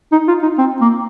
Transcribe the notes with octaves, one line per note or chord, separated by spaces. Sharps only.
D#4
F4
D#4
C4
A#3